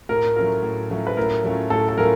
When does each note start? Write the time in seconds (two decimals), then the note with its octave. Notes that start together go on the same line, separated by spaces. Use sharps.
0.09 A2 A#4
0.36 F#3 A3 C#4 F4 A#4
0.63 A2
0.90 F#3 A3 C#4 F4
1.07 B4
1.17 A2 A#4
1.44 F#3 A3 C#4 F4
1.70 A2 A4
1.89 A4
1.98 F#3 A3 C#4 F4 A#4